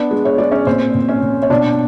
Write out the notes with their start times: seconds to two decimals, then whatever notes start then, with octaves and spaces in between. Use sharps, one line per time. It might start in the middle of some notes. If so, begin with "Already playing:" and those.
Already playing: B3 D4 D5
0.11 G#3
0.25 C#5
0.38 G#3 D5
0.52 C#4 C#5
0.66 A#2 C4 C5
0.94 A#2
1.08 C#4 C#5
1.22 A#2
1.43 C#5
1.50 B2 D4 D5